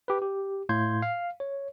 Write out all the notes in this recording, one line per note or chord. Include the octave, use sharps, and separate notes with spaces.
G4 B4
G4
A2 F5 C6 G6 G#6
F5
C#5